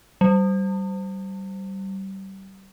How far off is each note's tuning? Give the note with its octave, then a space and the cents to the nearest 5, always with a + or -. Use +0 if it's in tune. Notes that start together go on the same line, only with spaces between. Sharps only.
G3 -30